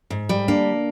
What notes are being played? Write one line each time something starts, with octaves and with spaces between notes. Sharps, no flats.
G#2
G3
A#3 D4